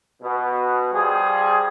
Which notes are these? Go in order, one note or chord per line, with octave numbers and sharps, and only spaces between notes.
B2
F3 G3 G#4